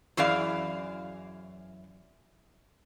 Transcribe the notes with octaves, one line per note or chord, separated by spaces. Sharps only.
F#2 E3 G#4 D5 F5